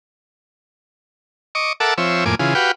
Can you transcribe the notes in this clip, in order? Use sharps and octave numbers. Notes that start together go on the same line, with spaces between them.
D#5 C#6 D6
A4 A#4 E5 F#5 A5 D6
F3 C4 C#5 E5
F2 A2 A#3 G#5 D6
C#3 E3 F4 G#4
F#4 G4 B4 F5 G5